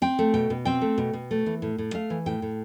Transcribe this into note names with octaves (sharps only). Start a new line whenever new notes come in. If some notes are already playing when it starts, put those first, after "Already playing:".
C4 G5
A3
B2 G5
B2
C4 G5
A3
B2
B2
A3
E3
A2
A2
A3 F5
E3
A2 G5
A2